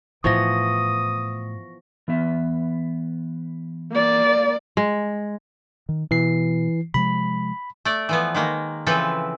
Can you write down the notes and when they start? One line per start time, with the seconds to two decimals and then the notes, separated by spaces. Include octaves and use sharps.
0.24 A2 E3 F3 B3 C#6 D#6 A#6
2.08 E3 B3 E5
3.92 A#3 D5
4.77 G#3
5.89 D#3
6.11 B2 E3 C7
6.94 C3 F3 G#3 B5
7.85 A3 D5
8.09 E3 F3 B3
8.35 D#3 G#3 A#3
8.86 C#3 E3 F3 C4 A4 B4